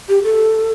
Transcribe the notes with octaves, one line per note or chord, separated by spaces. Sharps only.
G4
A4